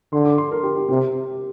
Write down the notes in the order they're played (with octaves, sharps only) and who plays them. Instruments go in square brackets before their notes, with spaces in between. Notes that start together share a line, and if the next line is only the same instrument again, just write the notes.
[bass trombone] D3 [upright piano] C6
[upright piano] D6
C6
A#4
G4
G4
[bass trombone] C3 [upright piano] G4